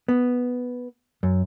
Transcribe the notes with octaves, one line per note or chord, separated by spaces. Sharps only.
B3
F#2